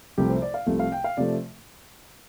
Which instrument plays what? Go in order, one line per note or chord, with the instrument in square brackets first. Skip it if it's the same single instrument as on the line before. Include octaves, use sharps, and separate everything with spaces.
[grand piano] C2 C3 F3 A3 G4
C5
D5
F5
C2 C3 F3 A3
F5
G5
F5
C3 F3 A3 D5